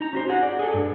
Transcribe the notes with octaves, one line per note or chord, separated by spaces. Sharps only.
D#4 A#5
C#4 F#4 C5
F#4 G#4 F#5
D5
G#4 A4
G2